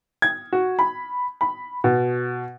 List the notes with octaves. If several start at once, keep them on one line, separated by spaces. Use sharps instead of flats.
G#6
F#4
B5
B5
B2